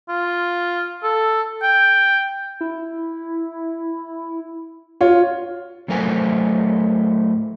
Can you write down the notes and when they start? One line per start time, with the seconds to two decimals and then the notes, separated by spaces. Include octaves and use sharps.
0.09 F4
1.03 A4
1.62 G5
2.61 E4
5.01 F4 F#4 C#5
5.88 A2 F#3 A3 A#4 C5 G#5